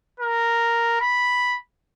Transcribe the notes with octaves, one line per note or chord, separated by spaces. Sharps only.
A#4
B5